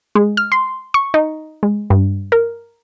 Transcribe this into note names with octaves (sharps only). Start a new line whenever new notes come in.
G#3
F6
C6
C#6
D#4
G#3
G2
A#4